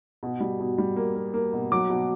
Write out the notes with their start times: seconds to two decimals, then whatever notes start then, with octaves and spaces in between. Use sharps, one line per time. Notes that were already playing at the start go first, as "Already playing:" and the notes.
0.23 B2
0.40 G3
0.60 B2
0.78 G3
0.96 A#3
1.16 A#3
1.34 A#3
1.53 B2
1.72 F#3 D6
1.90 B2